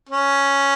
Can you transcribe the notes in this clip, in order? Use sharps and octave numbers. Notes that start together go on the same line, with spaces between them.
C#4